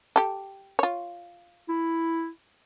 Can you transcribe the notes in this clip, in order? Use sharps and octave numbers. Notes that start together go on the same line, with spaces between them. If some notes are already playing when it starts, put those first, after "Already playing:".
G4 A4
F4 C#5
E4